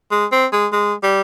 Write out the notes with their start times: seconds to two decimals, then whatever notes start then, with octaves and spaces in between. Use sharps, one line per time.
0.11 G#3
0.32 C4
0.53 G#3
0.72 G#3
1.03 G3